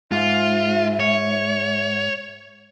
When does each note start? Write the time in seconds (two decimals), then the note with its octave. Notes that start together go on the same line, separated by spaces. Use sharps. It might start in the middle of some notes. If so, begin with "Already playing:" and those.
0.12 G#2 F4 E5
1.00 C#5